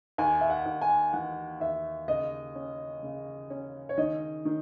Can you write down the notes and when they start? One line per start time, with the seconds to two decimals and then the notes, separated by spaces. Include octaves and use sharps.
0.18 D#2 G#5
0.41 E5
0.50 F#5
0.66 D#2
0.81 G#5
1.13 E3 F#5
1.60 D#2 E5
2.08 C#3 D#5
2.55 C#4
3.03 C#3
3.50 C#4
3.89 C#5
3.98 D#3 D#5
4.45 D#3